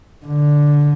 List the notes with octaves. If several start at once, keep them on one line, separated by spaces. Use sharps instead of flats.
D3